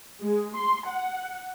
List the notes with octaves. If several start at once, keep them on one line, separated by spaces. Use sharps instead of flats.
G#3
C6
F#5